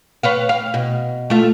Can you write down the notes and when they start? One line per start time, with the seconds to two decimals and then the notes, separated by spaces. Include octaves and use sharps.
0.23 B4 C#5 F5
0.49 F5
0.74 B2
1.30 A3 F4